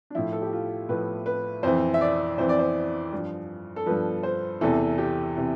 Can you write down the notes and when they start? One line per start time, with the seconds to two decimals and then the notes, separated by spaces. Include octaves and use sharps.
0.10 D4
0.15 A2 F3 E4
0.32 A4
0.42 G4
0.53 F4
0.89 A2 F3 B4
1.26 B4
1.63 F2 E3 C5
1.94 E5
2.01 D5
2.38 F2 E3 C5
2.49 D5
2.59 C5
3.12 G2 F3
3.76 A4
3.86 G2 F3 B4
4.23 C5
4.61 E2 C3 E3 A4
4.98 G4
5.37 C3 E3